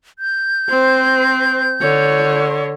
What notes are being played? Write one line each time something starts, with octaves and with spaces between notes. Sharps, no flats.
G6
C4 C5
D3 C#5